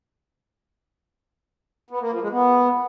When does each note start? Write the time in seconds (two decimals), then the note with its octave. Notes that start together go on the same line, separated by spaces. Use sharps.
1.90 B3
2.01 A#3
2.11 F3
2.21 G#3
2.31 B3